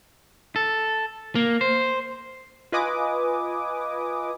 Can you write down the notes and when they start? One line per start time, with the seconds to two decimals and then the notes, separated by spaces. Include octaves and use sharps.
0.56 A4
1.35 A#3
1.61 C5
2.72 F4 B4 D#5 G#5 D6 D#6